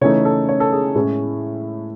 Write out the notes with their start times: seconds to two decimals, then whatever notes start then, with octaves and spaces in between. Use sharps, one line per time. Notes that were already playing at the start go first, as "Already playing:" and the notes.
0.01 C#3 E3 A3 D#4 C#5
0.25 A4
0.49 C#5
0.60 A4
0.72 G#4
0.95 A2 G#3 C#4 E4